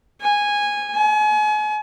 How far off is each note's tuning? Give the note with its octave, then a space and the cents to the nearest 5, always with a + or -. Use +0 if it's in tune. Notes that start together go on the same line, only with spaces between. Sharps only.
G#5 -10
G#5 +35